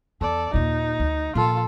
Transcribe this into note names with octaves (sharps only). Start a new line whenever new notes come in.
E2 A4 D5
D#2 A#2 D#4
D2
A#2 F3 F4 A4